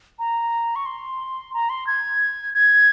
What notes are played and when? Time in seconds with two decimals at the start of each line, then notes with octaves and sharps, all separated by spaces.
0.19 A#5
0.76 C#6
0.86 C6
1.54 A#5
1.70 C6
1.87 G#6
2.54 G#6